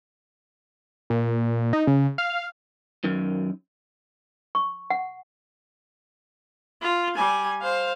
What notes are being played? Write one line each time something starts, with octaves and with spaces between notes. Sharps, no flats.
A#2
D#4
C#3
F5
F#2 D#3
C#6
F#5
F4
G3 G#5
C5 F5